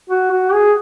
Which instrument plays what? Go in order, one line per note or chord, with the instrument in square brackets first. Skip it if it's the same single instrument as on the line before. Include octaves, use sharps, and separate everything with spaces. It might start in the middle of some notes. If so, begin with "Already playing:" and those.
[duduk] F#4
F#4
G#4